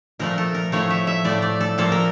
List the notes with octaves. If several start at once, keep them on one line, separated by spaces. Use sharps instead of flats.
A#2 F3 A3 A#4
A4
A#4
A2 F3 A3 C#5
E5
E5
A2 F3 A3 D5
D5
A4
A#2 F3 A#3 A4
A#4